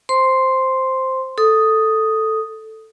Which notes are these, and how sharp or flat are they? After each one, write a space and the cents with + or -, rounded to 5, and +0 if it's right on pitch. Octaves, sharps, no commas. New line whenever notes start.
C5 +0 C6 +0
A4 +0 D#6 +0